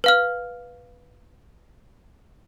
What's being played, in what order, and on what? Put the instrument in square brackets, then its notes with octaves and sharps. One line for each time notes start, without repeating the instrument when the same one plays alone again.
[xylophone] B4 F5 F6